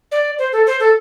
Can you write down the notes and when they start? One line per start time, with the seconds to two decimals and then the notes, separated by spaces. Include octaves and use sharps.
0.12 D5
0.39 C5
0.53 A4
0.67 C5
0.80 A4